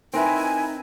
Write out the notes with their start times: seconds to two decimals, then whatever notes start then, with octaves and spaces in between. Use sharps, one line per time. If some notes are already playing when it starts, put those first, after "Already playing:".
0.13 C4 D#4 E4 A#4 B4 G#5